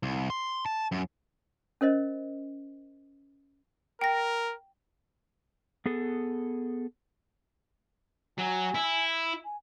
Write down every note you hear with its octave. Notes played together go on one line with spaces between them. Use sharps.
C2
C6
A5
F#2
C#4 A#4 C5 D#5
A#4 G5 A#6
B3 G#4 A4
F#3 G#5
E4
G#5